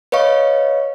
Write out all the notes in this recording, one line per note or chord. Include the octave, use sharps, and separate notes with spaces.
B4 C#5 D#5 F5 C#6